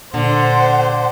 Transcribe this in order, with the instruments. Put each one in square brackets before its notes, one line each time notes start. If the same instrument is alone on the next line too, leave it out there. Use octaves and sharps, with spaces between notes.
[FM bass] A#2 [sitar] D3 [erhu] C5 [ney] F#5